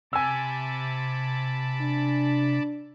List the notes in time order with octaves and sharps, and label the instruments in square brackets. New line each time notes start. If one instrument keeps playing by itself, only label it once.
[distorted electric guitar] C3 [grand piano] G#5 E6 [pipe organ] A5 B5 D6
[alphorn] D4